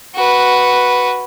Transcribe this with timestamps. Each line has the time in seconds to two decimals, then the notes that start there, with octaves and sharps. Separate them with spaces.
0.15 F#4 B4